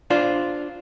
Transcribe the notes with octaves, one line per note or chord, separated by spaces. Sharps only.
D4 F4 C5